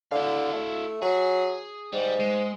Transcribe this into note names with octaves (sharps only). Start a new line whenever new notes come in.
D3 E4 F5
A3
F#3 G#4
G#2 G3
G#3